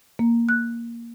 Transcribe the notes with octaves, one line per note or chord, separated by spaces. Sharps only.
A#3
F#6